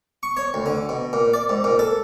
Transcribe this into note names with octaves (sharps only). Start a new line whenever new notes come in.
C#6
C#5
D2
D3
B2
A#2
D5
G#2
A#2
A4